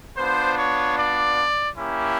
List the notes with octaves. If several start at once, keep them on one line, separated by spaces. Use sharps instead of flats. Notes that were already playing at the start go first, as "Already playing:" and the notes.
B3 D4 F4 C5
C#5
D5
A#3 C#4 E4 G4